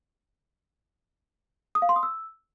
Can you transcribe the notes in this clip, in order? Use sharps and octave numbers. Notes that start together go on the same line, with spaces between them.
D#6
F5
C6
D#6
E6